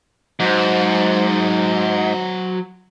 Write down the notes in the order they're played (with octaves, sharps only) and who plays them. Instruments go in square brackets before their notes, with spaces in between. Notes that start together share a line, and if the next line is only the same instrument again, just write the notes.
[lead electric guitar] G#2 [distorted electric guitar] F#3 C5